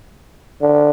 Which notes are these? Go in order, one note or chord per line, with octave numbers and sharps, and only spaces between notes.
D3